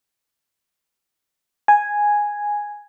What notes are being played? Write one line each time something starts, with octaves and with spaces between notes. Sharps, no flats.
G#5